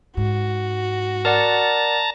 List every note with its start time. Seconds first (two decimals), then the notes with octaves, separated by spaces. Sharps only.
0.17 G#2 F#4
1.25 A#4 D5 F#5 A5 A#5